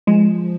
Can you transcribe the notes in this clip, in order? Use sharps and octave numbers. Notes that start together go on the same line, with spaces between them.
F3 G#3